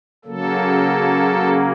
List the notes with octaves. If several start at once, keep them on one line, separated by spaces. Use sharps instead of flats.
C#3 F#3 A#3 A4